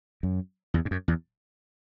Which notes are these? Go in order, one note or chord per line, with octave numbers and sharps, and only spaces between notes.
F#2
E2
G#2
F#2
E2